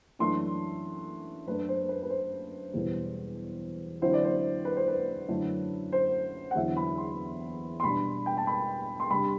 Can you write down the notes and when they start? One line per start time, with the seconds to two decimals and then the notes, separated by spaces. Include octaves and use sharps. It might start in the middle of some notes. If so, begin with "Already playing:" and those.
0.19 F#2 E3 A3 D4 C6
1.47 F#2 F#3 A3 D4 B4
1.69 C5
1.89 B4
2.03 B4
2.10 C5
2.74 E2 B2 G3 B3 E4
4.01 D3 F#3 C4 E4 C5
4.13 D5
4.24 C5
4.65 B4
4.77 C5
4.88 B4
5.28 F#2 D3 A3 E4
5.92 C5
6.51 F#5
6.55 E2 D3 F#3 B3 E4 E5
6.77 B5
6.98 C6
7.80 C6
7.83 B2 G3 D4 B5
8.26 G5
8.37 A5
8.47 B5
9.00 C6
9.10 C3 G3 D4 B5